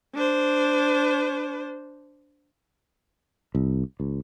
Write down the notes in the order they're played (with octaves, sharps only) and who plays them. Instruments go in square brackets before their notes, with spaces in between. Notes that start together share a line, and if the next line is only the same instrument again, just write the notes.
[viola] D4 C5
[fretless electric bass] C2
C#2